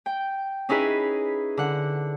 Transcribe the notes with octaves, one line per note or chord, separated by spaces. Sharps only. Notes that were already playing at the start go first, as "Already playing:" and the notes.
G5
C#4 D#4 E4 G#4 B4
D3 F#5